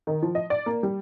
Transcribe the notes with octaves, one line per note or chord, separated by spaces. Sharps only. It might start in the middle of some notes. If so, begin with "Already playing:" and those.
D#3
F3
D#5
D5
A#3
G3